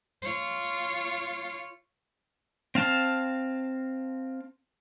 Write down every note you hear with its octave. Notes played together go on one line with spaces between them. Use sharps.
F4 C#5
C4 F5 A5